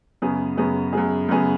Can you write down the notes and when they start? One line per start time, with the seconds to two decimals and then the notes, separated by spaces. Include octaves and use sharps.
0.22 F#2 C#3 B3 G#4
0.57 F#2 C#3 B3 G#4
0.93 F#2 C#3 B3 G#4
1.28 F#2 C#3 B3 G#4